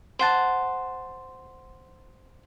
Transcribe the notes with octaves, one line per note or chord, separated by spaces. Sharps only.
C5 F#5 A5